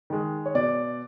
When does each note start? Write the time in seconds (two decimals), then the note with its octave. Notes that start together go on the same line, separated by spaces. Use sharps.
0.10 D#3 G#3
0.46 C#5
0.55 B2 D5